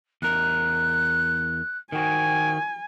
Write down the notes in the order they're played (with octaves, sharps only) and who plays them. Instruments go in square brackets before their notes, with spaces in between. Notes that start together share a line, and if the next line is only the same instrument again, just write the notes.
[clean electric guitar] E2 A#4 [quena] F#6
[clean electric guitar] D#3 F#4 [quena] G5 [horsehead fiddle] G#5